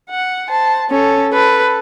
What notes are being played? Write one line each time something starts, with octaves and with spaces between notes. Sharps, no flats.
F#5
C5 A5
C#4 A4
A4 B4